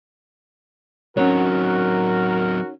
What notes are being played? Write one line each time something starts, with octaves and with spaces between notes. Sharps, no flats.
F#3 C4 C#4 D#4 F#4 A#4 C#5